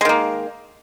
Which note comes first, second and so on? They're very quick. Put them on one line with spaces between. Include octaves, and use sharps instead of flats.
G#3 D#3 A#3